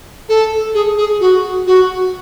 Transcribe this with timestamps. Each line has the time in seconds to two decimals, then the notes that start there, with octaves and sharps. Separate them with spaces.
0.29 A4
0.74 G#4
0.98 G#4
1.20 F#4
1.67 F#4